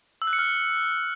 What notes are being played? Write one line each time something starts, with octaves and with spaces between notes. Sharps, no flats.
E6
F#6
C#7
F6